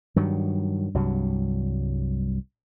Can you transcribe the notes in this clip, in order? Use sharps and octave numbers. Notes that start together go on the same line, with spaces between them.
G2 D#3 F#3
C2 G2 F#3